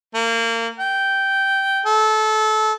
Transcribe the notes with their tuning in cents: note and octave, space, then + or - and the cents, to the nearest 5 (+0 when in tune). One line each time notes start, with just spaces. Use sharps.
A#3 -30
G5 -10
A4 -25